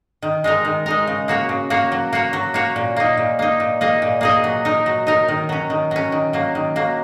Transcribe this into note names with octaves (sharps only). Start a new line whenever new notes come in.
D#3
G#3 D#4 A#4
D#3
G#3 D#4 A#4
C#3
A#3 F#4 C#5
C#3
A#3 F#4 C#5
F#3
A#3 F#4 C#5
F#3
A#3 F#4 C#5
A#2
A#3 D#4
A#2
A#3 D#4
A#2
A#3 D#4 G#4 D#5
A#2
A#3 D#4 G#4 D#5
F#3
D#4 A#4
F#3
D#4 A#4
D#3
F#3 C#4
D#3
F#3 C#4
D#3
F#3 A#3
D#3
F#3 A#3